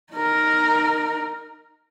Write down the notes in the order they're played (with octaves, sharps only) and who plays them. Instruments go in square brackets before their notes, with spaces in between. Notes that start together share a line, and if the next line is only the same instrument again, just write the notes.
[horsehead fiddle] D#4 A#4